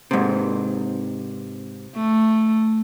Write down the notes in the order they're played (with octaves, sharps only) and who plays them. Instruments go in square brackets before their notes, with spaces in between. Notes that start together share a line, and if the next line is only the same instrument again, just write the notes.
[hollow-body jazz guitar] G#2 C3
[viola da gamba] A3